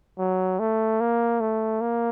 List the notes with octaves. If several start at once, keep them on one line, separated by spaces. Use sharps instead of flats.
F#3
A3
A#3
A3
A#3